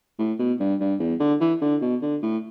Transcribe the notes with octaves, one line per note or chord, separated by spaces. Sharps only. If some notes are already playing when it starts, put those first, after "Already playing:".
A2
B2
G2
G2
E2
D3
E3
D3
B2
D3
A2